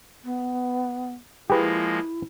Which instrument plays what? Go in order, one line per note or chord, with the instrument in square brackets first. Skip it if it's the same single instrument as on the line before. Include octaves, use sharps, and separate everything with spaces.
[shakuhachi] B3
[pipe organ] F3 G#3 A#3 [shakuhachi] E4 [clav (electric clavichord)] G4 G#4 B4